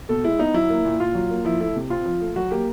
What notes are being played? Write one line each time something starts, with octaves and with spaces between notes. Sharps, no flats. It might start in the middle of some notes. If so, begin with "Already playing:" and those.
B2 A4
G#3 E4
B3 D#4
F#3 E4
A#3
A#2
A#2 F4
F#3
A#3
F3 E4
A3 E4
C3
C4 F4
F3
A3
F#3 F#4
A#3 G4